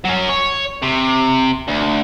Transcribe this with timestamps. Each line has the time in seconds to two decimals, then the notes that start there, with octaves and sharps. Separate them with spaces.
0.05 F#3 C#4
0.30 C#5
0.83 C3
1.68 D2